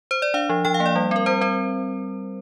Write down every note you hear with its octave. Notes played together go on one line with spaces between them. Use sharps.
C5
D5
D4 F5
F3
F3 G5
F5
A#3
D5
G3
C4 A#4
G3 C5
C4 C5